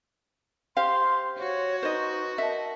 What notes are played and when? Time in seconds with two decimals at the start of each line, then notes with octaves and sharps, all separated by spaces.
0.77 G4 C5 F5 C6
1.38 F#4 C#5
1.83 D#4 B4 C5 D#5 C6 C#6
2.38 A#4 D#5 E5 A5